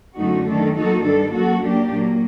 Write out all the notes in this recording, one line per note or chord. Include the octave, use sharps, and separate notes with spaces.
F#2 D3 A3 D#4 F#4
D#3 A3 D4 A4
F#3 A#3 D#4 F#4 A4
G2 D#3 G3 D4 A4
F#2 F#3 A#3 F#4 A4
F#3 A#3 D4 G4
A#2 F#3 A#3